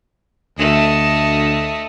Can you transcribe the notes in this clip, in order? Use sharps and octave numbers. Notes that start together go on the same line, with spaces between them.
D2 A3 D#5